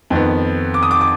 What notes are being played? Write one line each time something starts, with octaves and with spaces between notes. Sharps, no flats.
F2 D#3 B3
D6
D#6
D6
D6